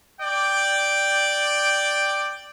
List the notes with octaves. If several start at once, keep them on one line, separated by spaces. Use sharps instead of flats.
D5 G5